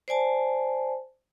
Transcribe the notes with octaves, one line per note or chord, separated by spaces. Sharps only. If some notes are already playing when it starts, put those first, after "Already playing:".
C5 D5 G#5 A5